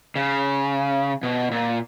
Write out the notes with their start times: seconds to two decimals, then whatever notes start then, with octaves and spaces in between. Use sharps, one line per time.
0.16 C#3
1.23 B2
1.51 A#2